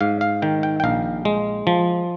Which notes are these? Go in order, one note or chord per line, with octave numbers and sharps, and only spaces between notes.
G#2 F5
F5
D#3 G5
G5
G5
A#1 F5
G#3
F3